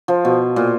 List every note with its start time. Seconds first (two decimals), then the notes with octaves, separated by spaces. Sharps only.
0.08 F3
0.25 B2
0.56 A#2